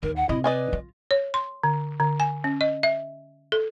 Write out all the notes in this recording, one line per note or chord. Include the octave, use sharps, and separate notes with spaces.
D#2 A#4
F#5
C3 E4 D#5
B4 D5 D#5 G#5
F4
C#5
C6
D3
D3
G#5
C#4
D#5
E5
A4